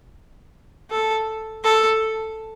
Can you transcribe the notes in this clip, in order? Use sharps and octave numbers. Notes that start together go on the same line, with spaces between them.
A4
A4